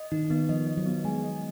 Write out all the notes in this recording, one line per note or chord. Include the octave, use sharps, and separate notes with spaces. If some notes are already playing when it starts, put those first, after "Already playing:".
Already playing: D#5
D#3 D#4
D#3 B3
F3 D#5
D#5
F#3
B3
G#3 G#5
D#5